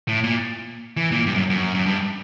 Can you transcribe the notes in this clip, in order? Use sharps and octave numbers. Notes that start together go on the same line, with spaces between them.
A2
A#2
E3
A#2
G2
F#2
F#2
F#2
G2